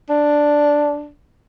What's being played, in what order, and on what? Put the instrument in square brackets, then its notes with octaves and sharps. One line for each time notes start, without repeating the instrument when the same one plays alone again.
[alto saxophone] D4